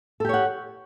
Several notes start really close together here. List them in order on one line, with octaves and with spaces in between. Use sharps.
A4 G4 C#5 F#5